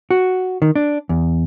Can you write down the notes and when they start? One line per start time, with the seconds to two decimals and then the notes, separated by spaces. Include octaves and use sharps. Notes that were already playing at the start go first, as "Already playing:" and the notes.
0.11 F#4
0.62 D#3
0.76 D4
1.09 E2